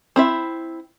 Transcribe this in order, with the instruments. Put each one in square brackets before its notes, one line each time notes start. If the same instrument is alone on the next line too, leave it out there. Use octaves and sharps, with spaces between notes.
[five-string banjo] C4 E4 E5